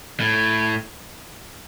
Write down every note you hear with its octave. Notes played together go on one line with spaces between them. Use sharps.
A2